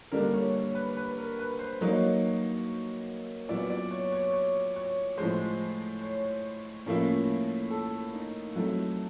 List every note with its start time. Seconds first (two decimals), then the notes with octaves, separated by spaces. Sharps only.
0.12 D3 G3 A#3 D4 A#4
0.34 C#5
0.54 C#5
0.75 B4
0.97 B4
1.18 A#4
1.39 B4
1.59 C5
1.81 F#3 A#3 D#4 C#5
3.49 A#2 F#3 B3 E4 D5
3.70 D5
3.91 C#5
4.12 C#5
4.33 C#5
4.76 C#5
5.17 A2 F3 G#3 C5
6.02 C#5
6.86 A2 F3 A#3 C#4 E4
7.71 A4
8.14 D#4
8.56 F#3 A3 C4 E4